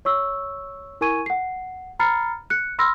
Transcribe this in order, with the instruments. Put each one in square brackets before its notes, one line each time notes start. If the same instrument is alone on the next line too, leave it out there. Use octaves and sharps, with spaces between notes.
[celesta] C#5 C#6 E6
E4 A#4 G#5 C#6 G#6 D#7
F#5 C7
A#5 B5 F6 A6 C7 C#7
F#6 C#7
B5 C6 E6 F6 A#6